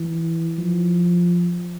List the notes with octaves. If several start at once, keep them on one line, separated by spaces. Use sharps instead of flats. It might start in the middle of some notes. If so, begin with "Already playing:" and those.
Already playing: E3
F3